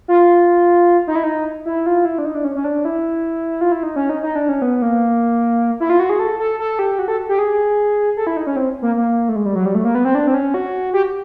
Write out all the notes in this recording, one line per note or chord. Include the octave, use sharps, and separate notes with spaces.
F4
D#4
E4
D#4
E4
F4
E4
D4
D#4
D4
C#4
C#4
D4
E4
F4
E4
D#4
C#4
D#4
D#4
D4
C#4
B3
A#3
E4
F4
F#4
G#4
A4
A4
A4
G4
F#4
A4
G4
G#4
A4
E4
D#4
C#4
C4
A#3
A#3
A3
G#3
G3
F#3
G3
A3
A#3
B3
C4
D4
C4
C#4
F#4
G4